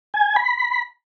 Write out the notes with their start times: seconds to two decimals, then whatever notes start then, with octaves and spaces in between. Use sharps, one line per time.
0.14 G#5
0.36 B5